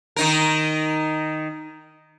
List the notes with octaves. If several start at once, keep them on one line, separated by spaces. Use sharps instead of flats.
D#3 D#4 A#4